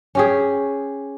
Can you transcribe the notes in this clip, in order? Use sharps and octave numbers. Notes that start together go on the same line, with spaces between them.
C#4 G4 G#4